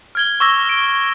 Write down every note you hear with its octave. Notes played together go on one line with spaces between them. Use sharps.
F6 G#6 G7
C#6 D6 E6 G#6 A#6 G7
D7